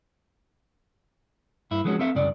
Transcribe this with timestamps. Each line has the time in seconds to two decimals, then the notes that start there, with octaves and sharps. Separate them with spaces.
1.71 G2 E4
1.85 F3 F#3 G#3 B3 C#4 F#4
1.99 C4 A4 E5 F5
2.15 C2 F#2 C#3 D5